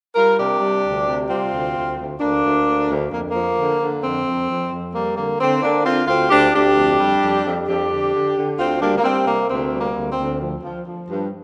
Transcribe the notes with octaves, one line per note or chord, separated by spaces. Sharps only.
G3 F4 A#4
C3 D4 G4
G3
D2
C3
G3 C4 F4
D2
D2
D2
D2 A#3 D4
D2
D2
D2
F2 A#3
F3 A#3
D3
D3
F2 C4
F2
F2
F2
G3 A#3
D3 A#3
D3 C4
D3 A#3 D4
D3 C4 F4
D2 C4 F4
D2 D4 G4
D2 D4 G4
F2
G3
F2
F2
F2 D4 G4
D3
D3
D3
D2 C4 F4
G3 A#3 D4
A#3
G3 C4
C3 A#3
D2 C4
G3
A#3
D2
C4
D2
F3
F3
F3
G2